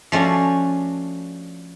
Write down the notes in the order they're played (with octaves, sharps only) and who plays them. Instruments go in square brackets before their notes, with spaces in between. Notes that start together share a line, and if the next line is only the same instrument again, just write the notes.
[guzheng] F3 A3 C#4 D4 F#4